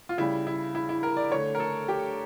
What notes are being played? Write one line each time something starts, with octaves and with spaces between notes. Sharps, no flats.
F4
C#3 G3 E4
E4
E4
E4
A#4
D5
D3 A3 C#5
A#4
A4
G4